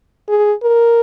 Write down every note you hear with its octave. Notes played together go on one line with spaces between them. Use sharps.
G#4
A#4